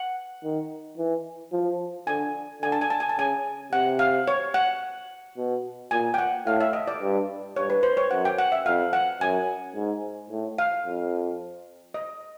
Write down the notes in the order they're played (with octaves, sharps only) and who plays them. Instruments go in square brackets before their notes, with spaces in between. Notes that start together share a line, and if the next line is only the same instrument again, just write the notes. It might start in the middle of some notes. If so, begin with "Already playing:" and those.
Already playing: [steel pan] F#5
[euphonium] D#3
E3
F3
[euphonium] D3 [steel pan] G#5
[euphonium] D3 [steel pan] G#5
[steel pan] A5
G#5
A5
G#5
A5
[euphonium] C#3 [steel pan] G#5
[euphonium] C3 [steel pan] F#5
[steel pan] F5
C#5
F#5
[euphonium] B2
[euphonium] A#2 [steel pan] G#5
[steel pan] G5
F#5
[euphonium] A2 [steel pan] F5
[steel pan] E5
D#5
D5
[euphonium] G2
[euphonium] G2 [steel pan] C#5
[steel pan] B4
C5
C#5
[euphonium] F#2 [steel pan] F#5
[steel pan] G5
F#5
E5
[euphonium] F2 [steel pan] F5
[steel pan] F#5
[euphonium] F#2 [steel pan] G#5
[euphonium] G#2
A2
[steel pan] F5
[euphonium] F2
[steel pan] D#5